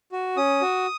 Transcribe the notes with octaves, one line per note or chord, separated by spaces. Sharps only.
F#4
C#4 D#6
F#4